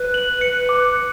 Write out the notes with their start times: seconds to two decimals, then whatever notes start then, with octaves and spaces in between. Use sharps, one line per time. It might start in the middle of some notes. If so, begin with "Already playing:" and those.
Already playing: B4
0.14 F#7
0.41 C#7
0.69 D6
0.96 C#7